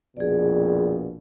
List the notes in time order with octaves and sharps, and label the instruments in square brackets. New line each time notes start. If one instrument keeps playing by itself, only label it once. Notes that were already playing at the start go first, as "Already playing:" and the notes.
[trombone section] A#1 F2 B2 [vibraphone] G#4 D5